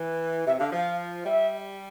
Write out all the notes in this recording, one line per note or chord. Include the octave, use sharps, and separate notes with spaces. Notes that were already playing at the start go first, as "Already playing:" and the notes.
Already playing: E3
C3 E5
D3 F5
F3 F5
G3 E5